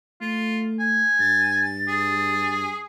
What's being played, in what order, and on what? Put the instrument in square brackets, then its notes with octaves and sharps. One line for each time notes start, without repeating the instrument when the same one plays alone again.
[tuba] A3 [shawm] F4
[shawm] G#5
[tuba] G2 [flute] A6
[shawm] G#4